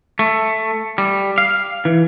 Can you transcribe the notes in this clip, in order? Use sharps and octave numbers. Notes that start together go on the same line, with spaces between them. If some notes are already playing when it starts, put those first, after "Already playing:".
A3
G3
F5
E3